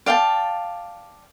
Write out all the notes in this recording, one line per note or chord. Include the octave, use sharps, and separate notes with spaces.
D5 F5 G5 A5